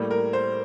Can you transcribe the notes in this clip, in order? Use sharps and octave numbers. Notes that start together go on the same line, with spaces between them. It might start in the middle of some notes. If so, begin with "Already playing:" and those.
Already playing: A2 G3 A#3
A#4
C5